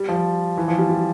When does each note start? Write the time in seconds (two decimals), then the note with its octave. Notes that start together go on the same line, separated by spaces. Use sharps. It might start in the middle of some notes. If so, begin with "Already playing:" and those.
Already playing: G3
0.08 F3
0.57 E3
0.68 F3
0.78 G3
0.89 G3